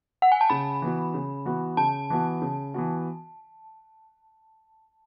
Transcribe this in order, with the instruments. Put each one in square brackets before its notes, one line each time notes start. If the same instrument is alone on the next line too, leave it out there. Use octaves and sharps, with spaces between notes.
[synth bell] F#5
G#5
A5
[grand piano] C#3 [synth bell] B5
[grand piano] E3 B3 F#4
C#3
E3 B3 F#4
[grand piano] C#3 [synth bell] A5
[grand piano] E3 B3 F#4
C#3
E3 B3 F#4